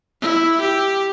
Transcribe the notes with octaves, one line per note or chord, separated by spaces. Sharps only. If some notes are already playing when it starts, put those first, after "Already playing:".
E4
G4